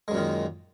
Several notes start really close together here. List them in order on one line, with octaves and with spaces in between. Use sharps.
G#3 F#2 A#2 D#3